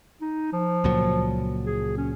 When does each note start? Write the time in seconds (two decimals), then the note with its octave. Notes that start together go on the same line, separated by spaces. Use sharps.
0.21 D#4
0.53 F3
0.84 C#2 A#2 F#3
1.66 G#4
1.97 C#4